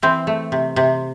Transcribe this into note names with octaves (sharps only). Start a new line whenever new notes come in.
E3 C4
A3
C3
C3